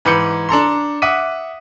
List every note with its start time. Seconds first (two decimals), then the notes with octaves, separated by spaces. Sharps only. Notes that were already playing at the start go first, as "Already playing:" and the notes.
0.05 G#2 E3 B5 D6 G6 C#7
0.49 D4 A4 A#5 C6
1.02 E5 F#5 D6 D#6 B6 D#7